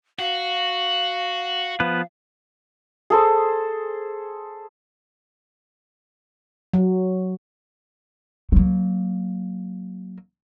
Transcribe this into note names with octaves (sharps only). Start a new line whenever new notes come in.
F#4 F5
F3 B3 B4
G#4 A4 C5
F#3
F#3 A#3